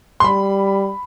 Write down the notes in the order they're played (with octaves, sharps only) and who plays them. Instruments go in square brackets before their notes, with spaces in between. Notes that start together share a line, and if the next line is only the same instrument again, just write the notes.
[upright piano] C6
[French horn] G3 [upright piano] B5